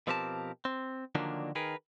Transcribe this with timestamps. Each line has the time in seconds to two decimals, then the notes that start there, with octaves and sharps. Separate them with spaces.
0.07 B2 F3 C4 G4 A#4 A5
0.65 C4
1.15 D3 D#3 F3 F#3 A#3 D4
1.55 D#3 G#4 A#4 B4